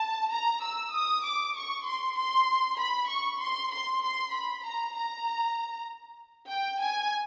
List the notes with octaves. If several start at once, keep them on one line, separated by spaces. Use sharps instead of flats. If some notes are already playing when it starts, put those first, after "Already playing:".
Already playing: A5
A#5
E6
D#6
D6
C#6
C6
C6
B5
C#6
C6
C6
C6
B5
A#5
A#5
G5
G#5